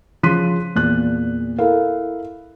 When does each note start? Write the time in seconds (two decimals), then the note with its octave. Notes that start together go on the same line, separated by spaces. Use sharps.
0.23 C#3 F3 C6 F#6 B6 D#7
0.75 E2 A#2 F#6
1.58 E4 A4 A#4 F5